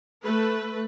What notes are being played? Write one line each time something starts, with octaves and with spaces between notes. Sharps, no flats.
A3 B4